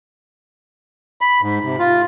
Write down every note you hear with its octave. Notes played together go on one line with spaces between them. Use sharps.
B5
G#2
C3
F4